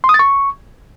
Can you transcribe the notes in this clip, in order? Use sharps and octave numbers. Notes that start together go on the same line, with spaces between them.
C6
D#6
A6
C#6